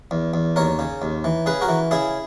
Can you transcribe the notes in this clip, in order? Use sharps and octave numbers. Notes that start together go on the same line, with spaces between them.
E2
E2
D#2 A#4 C#5
C#3
D#2
E3
C#3 G#4 B4
F#4 A#4
E3
C#3 E4 G#4